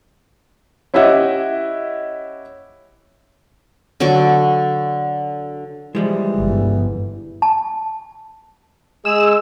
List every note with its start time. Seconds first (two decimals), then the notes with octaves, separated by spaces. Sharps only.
0.94 C#4 E4 G4 D#5 E5 F#5
4.00 D3 F#3 C#6 D6
5.95 E3 F3 G3 G#3
6.40 G1
7.42 A5
9.05 G#3 G#4 E6